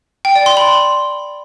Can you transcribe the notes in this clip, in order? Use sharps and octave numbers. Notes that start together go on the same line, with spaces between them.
G5
D5
C6
B5